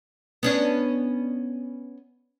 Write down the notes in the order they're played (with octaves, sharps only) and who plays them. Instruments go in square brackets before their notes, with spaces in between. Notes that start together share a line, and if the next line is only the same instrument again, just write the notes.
[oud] B3 C#4 D4